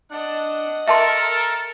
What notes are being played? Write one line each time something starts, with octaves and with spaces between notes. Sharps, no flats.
D4 D#5 F#5
A4 A#4 E5 A5 C6